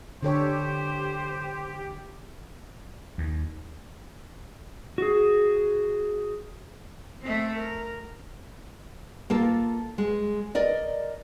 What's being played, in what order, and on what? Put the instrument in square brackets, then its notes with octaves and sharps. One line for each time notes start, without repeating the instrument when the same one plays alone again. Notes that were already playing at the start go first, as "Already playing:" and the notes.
[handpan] D3 A4 C#5 [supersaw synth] G4 [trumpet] C5
[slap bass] D#2
[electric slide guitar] F#4 G#4
[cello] A3 C4
A#4
[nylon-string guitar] A#3 F4 A4
G#3
A#4 D5 D#5